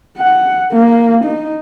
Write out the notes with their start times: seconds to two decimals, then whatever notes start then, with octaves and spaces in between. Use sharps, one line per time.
0.18 F#5
0.73 A#3
1.25 D#4